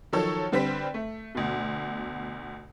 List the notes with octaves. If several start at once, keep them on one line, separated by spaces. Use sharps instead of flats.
D#3 F3 F#3 A4 C#5
D3 G3 C4 B4 B6
A3
D2 B2